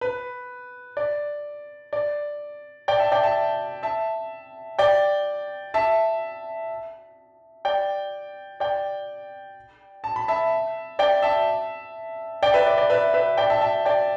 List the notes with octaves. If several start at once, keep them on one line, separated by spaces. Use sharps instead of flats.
B4
D5
D5
D5 G5
E5 A5
D5 G5
E5 A5
E5 A5
D5 G5
E5 A5
D5 G5
D5 G5
A5
B5
E5 A5
D5 G5
E5 A5
D5 G5
B4 E5
D5
D5
B4 E5
B4 E5
D5 G5
E5 A5
E5 A5
D5 G5